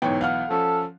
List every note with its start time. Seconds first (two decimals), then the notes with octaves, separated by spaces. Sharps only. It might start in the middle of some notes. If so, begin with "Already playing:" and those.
0.02 B1 G#2 E3 B3 C#5 G5
0.21 F5 F#5 F6
0.50 F3 C#4 A4